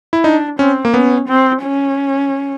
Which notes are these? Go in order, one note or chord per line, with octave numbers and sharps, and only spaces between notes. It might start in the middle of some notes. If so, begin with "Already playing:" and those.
E4
D4 D#4
C4 C#4
A#3
B3 C#4
C4
C#4